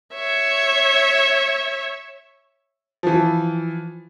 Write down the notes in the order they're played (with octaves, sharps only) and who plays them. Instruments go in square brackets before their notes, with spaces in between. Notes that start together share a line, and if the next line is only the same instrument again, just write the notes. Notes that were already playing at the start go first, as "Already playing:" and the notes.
[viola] C#5 E5
[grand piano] E3 F3